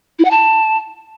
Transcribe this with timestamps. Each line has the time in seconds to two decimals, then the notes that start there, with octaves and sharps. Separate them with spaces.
0.19 E4
0.25 F#5
0.31 A5